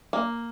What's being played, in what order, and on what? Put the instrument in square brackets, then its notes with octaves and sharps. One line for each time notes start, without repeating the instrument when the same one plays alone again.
[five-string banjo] A#3